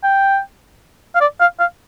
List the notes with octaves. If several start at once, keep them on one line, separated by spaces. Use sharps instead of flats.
G5
F5
D5
F5
F5